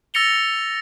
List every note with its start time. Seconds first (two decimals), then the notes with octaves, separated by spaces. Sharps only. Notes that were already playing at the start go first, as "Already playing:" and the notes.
0.14 E6 A6 A#6 C#7 F7 G7